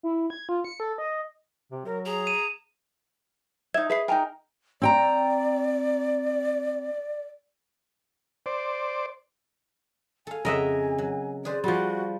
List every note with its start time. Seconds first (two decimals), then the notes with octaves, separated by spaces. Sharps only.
0.03 E4
0.30 G#6
0.49 F4
0.64 C#7
0.80 A4
0.98 D#5
1.72 C3
1.86 F#3 A#4
2.06 G#4 A#5
2.27 D#7 E7
3.74 D#4 E5 G#6
3.90 G#4 B4 D#5 E5 C7
4.08 D#4 A#4 G5 G#5 A#5
4.82 C4 D5 G5 A#5
8.46 C5 D5
10.27 A4 F5 G#5
10.45 F2 C#3 A#4 D#5 E5 F#5
10.98 F#3
11.45 G#4 B4 C5 D5
11.64 F3 G3 F#4